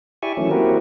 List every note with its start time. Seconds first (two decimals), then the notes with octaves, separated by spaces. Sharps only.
0.23 E4 G4 D5 E5 G#5 C#6
0.37 D#3 E3 F#3 A3 C#4
0.51 A#3 C4 E4 F#4 G4 A#4